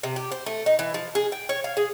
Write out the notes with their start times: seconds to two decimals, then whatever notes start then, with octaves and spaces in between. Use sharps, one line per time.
0.03 C3
0.16 G4
0.32 C5
0.46 A3
0.66 D#4
0.79 E3
0.94 F3
1.15 G#4
1.32 G5
1.49 C#5
1.64 F5
1.77 G#4